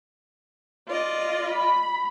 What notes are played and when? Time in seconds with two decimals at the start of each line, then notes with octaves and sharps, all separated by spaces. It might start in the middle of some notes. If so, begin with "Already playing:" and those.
0.87 F4 D5 D#5
1.47 B5